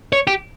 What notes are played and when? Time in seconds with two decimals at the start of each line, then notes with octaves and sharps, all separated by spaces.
0.13 C#5
0.27 G4